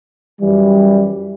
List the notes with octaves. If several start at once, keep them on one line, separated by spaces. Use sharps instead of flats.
F#2 E3 G3